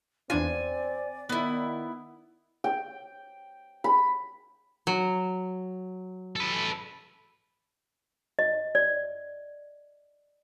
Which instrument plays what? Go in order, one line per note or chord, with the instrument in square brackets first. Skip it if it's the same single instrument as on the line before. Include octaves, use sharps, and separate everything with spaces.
[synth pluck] E2 D4 F4 [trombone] C4 [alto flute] D5 [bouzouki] G#5
[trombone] D#3 [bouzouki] B3 E4
[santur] G5
B5
[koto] F#3
[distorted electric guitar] A4 B4
[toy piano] D#5
D5